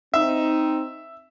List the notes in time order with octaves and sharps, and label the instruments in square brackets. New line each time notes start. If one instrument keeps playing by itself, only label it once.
[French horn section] C4 D#4 [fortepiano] E5